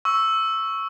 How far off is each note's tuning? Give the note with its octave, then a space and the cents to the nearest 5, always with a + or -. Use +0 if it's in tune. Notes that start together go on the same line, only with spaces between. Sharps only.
C#6 +0 E6 +0